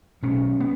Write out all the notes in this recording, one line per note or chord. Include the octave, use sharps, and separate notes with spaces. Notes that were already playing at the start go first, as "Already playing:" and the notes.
B1 B2 C#4
B3